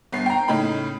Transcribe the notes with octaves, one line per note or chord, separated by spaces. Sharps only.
G1 B3 C7
G5 A#5
A2 C#3 D#4 B5